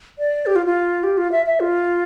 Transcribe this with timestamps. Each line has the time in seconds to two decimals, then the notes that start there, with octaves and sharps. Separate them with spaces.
0.19 D5
0.46 G4
0.56 F4
0.66 F4
1.03 G4
1.18 F4
1.32 E5
1.46 E5
1.60 F4